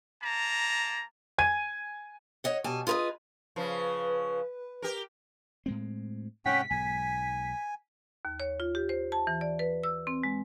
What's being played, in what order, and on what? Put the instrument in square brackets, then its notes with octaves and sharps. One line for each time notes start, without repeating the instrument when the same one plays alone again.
[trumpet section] A#3 A5 A#5
[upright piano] G#5 G#6 D#7
[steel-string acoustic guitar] C#5 D#5 F#5
B2 G3 G#5 A5
F4 G#4 A#4 B4 D#5
[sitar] C#3 F3 [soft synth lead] B4
[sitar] G4 A#4
[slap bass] A2 G#3 C4
[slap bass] G#2 C3 [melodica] C#4 F#5 G5 [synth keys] B6
[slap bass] B1 G#2 [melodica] G#5
[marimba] D#2
C#5
F4
G4
C5
A5
E3
D5
B4
E6
C4
G#3